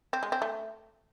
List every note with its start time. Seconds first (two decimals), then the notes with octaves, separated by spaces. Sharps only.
0.13 C4
0.23 G#3
0.32 C4
0.42 A3